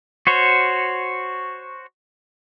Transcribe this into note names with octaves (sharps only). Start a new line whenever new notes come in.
F#4 C5 C#5